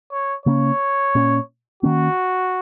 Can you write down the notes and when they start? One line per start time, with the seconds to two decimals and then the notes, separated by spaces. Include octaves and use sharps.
0.12 C#5
0.46 C#3 A#3 C#4 C#5
1.15 A#2 A#3 C#4
1.83 D#3 A#3 C#4 F#4